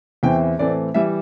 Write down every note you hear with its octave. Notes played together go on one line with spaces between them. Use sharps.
E2 E3 C4 E4 G5
A2 E3 A3 C4 D5
E3 G3 E4 E5